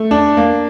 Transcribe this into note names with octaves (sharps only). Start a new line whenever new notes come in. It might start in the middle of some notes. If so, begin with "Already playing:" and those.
Already playing: A3
D4
A#3